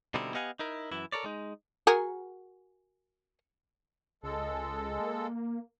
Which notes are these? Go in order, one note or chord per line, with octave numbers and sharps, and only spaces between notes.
B2 D3 G3 C4 D#4 E4
B3 G4 D#5 F5 F#5 G#5
D#4 E4 A#4
F#2 E3 E4
A4 A#4 C#5 D5
G#3 D#4
F#4 G#4 A#4
C#2 G#3 A4
A#3